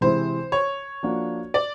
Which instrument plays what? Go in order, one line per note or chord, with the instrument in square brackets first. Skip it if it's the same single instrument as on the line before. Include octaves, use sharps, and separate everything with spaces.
[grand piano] C3 E3 G#3 C4 E4 [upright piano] C5
[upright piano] C#5
[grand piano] F3 A#3 D4 F#4
[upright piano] D5